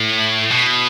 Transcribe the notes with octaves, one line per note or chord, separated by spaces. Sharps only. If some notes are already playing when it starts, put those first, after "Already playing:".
Already playing: A2
B2